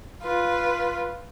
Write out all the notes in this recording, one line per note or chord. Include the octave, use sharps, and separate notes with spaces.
F4 B4